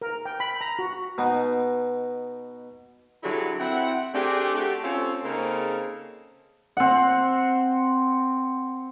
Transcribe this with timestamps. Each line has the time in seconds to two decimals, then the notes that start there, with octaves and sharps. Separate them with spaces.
0.02 A#4
0.25 G5
0.40 B5
0.61 A#5
0.79 F#4
1.18 B2 B3 D#4
3.24 D3 F#3 G3 E4 G#4
3.60 C4 E4 F#5
4.14 A3 C4 D4 G4 G#4
4.55 A3 F#4 G4
4.84 C4 C#4 F4 A4 C#5
5.24 C#3 A#3 C4 D#4 G#4 A4
6.77 C4 F#5